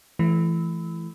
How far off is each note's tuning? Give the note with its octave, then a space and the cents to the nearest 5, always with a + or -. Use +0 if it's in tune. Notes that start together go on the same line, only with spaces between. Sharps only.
E3 +20 A3 -20